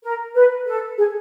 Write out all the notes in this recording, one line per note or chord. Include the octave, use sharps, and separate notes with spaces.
A#4
B4
A4
G#4